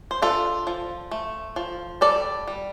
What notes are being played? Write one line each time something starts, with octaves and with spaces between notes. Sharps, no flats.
C5
D4 F4 A4
F3
A3
F3
G3 A4 D5
G3